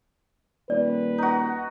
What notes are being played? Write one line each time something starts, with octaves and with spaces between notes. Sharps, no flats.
D#1 B4 D5
D#4 F#4